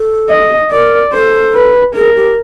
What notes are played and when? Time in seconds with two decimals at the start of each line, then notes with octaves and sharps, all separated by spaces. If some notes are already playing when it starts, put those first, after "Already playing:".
Already playing: A4
0.29 D#5
0.71 A#4 D5
1.13 A4 C5
1.55 B4
1.95 G#4 A#4
2.16 G4